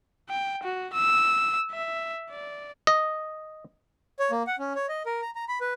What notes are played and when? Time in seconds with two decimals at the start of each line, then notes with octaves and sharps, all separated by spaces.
0.29 G5
0.63 F#4
0.94 E6
1.71 E5
2.30 D5
2.87 D#5
4.19 C#5
4.31 A#3
4.47 F#5
4.59 C#4
4.75 C#5
4.89 D#5
5.06 A#4
5.22 A#5
5.35 A#5
5.49 B5
5.61 B4